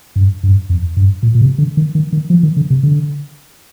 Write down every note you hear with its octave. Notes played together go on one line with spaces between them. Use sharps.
G2
G2
F2
G2
A#2
A#2
C3
D3
D#3
D#3
D#3
F3
D#3
D3
C3
D3